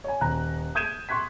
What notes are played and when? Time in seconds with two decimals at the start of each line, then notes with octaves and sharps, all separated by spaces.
0.04 C#5 G#5
0.21 D#1 A#5 F#6
0.75 D#6 G6 G#6 D#7 E7
1.09 C6 C#6 F#6 G#6 B6